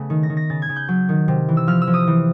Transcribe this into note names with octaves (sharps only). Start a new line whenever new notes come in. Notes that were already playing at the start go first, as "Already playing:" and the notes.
Already playing: C#3 A3 B3
D#3
A#6
D#3
A#6
C#3 A6
G#6
C#3
G6
F#3
D#3
C3
E3
E6
F3 F6
E6
F3
D#6
E3